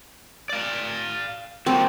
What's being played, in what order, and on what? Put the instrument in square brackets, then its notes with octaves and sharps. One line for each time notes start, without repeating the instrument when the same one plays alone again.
[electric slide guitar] D5 F5
[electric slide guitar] G3 A#3 F#4 [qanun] C4